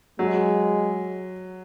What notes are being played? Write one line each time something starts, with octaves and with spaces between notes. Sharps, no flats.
F#3 G#3